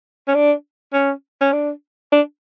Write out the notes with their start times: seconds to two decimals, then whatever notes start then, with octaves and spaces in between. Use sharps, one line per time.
0.28 C#4
0.35 D4
0.93 C#4
1.41 C#4
1.53 D4
2.12 D4